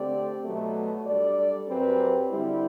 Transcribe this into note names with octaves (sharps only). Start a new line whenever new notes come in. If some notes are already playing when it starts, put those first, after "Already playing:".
Already playing: D3 A3 C4 G4 D5
B2 F#3 A3
G3 D4 A4 D5
F#2 F#3 C4 G4 B4
D3 G3 C4 E4